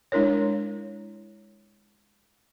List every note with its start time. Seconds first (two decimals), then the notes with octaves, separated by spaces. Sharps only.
0.12 G#3 D4 E4 A#4 C#5